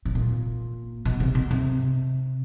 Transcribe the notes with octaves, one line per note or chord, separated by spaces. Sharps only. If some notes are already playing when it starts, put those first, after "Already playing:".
A2
A#2
B2
C3
B2
C3